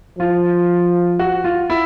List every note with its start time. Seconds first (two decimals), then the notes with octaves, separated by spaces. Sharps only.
0.19 F3 F4
1.19 F#4
1.44 F4
1.70 E4